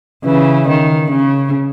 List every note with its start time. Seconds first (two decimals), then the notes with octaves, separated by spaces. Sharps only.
0.24 C#3 E3
0.68 D#3
1.11 C#3